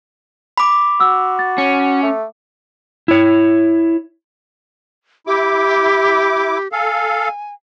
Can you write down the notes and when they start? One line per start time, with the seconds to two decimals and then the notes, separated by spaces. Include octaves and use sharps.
0.58 B5 D6
1.00 F#4 E6
1.39 A6
1.58 C#4
2.03 A3
3.08 E4 C#5
5.27 E4 G4 D6
6.72 A4 F5 G#5